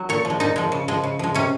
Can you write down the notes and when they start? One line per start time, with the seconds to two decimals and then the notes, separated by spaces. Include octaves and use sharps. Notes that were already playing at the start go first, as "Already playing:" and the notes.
Already playing: F#3
0.09 A#2 C#5
0.25 F3
0.30 G#3
0.40 A#2 D#4
0.56 F3 G#3
0.72 C#3
0.88 F3 G#3
1.04 C#3
1.19 F3 G#3
1.34 C3 C#4